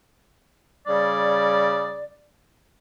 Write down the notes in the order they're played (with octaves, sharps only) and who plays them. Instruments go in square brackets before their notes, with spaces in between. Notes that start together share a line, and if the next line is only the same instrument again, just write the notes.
[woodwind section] C#3 G3 D5